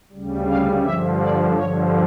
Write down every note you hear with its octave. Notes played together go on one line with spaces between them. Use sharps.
D2 C#3 G3
F5
G2 D3 F3 E5
D5
G2 D3 F3 C#5